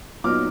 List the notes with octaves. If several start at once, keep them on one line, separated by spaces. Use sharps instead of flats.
A#2 F#3 B3 D#4 D6 F6